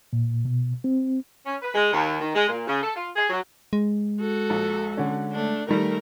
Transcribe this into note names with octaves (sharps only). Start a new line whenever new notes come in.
A#2
B2
C4
C#4
B4
G#3
D#2
D#3
G#3
A#2
C#3
A4
F4
G#4
F#3
G#3
F#4 A4
A#1
D3 C#4
A3 D4
D#3 G3 A3 A#4